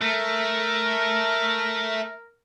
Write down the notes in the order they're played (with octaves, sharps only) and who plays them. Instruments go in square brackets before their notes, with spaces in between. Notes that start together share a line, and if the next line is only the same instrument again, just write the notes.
[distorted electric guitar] A3 [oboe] A#4